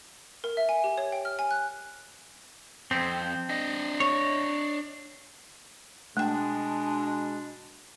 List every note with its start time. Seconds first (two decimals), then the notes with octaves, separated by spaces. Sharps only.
0.44 A#4
0.57 E5
0.69 G#5
0.84 G4
0.98 C#5
1.12 G5
1.25 F6
1.39 G#5
1.51 F#6
2.91 F2 C4
3.49 D4 D#5
4.00 C#5
6.17 B2 G#3 A3 D4 G5